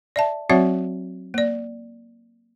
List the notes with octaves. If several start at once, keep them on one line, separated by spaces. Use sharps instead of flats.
D5 E5 A5
F#3 C4 F#4 C#5 E5 F#5
A#3 D5